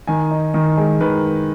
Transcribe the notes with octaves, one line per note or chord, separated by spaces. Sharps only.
D#3 G#5
D#4
D#3
G#3
D#3 B4